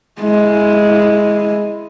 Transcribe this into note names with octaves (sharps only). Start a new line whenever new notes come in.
G#3 E4